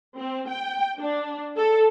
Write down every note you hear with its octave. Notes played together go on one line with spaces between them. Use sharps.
C4
G5
D4
A4